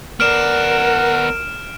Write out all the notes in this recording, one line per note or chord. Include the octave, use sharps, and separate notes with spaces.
B3 A#4 D5 F#5 F6 D7 E7